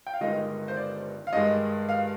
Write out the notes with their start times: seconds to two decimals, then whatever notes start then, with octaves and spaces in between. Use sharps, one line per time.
0.07 G5
0.14 F5
0.21 G1 G2 D#3 G#3 D#4 D#5
0.68 C5
0.77 D5
1.27 F5
1.33 G2 D#3 G#3 D#5
1.89 F5